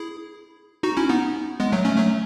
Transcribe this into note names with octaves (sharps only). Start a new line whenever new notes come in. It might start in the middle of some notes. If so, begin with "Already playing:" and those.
Already playing: E4 G#4
D#4 F#4
C#4 E4
B3 D#4
G#3 B3
F#3 A3
A3 C#4
F#3 A3